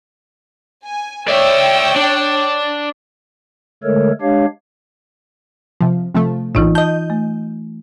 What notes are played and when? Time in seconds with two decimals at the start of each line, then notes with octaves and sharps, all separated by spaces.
0.83 G#5
1.28 C#5 D5 E5 G5 E6
1.96 D4
3.84 D3 G#3 A3 A4 A#4 C#5
4.21 G#3 D4 G4 C#5 F5
5.81 C3 F3
6.14 C3 F3 A3
6.55 A#1 A2 E3 D#4 F4
6.75 D#5 A5 G6
7.10 A3